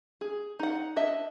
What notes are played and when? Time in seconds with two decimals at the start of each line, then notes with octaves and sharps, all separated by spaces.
0.21 G#4
0.59 D#4 F#5
0.96 D4 D#5 E5